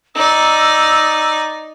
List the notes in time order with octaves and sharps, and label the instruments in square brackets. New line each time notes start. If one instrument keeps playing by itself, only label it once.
[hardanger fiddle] D#4 D5 [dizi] E6